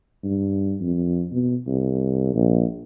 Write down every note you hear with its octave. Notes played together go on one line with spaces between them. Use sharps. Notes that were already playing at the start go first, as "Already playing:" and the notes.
G2
F2
B2
C2
A#1